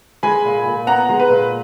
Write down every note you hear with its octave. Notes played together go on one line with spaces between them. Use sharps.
G#3 G#5 B5
A#2
A#2
B3 F#5 A#5
G#3
B4
A#2